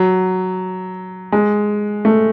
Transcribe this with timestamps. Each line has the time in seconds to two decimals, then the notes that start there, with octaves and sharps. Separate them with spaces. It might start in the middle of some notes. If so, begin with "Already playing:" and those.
Already playing: F#3
1.32 G#3
2.05 A3